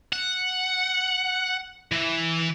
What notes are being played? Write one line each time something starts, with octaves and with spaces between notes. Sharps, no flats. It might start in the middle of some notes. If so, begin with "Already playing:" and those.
F#5
E3